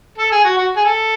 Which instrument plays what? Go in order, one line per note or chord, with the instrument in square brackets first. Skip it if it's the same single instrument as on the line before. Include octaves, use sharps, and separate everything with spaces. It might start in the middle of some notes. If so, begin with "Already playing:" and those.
[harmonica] A4
G#4
F#4
F#4
G#4
A4